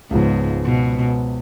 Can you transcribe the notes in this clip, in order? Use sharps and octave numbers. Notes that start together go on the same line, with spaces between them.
C#2 G#2 C#3 F3 B3
B2